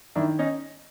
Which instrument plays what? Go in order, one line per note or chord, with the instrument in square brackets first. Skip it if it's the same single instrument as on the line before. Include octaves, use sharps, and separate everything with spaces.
[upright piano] D#3 [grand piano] D4 E4
[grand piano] C#4 D#4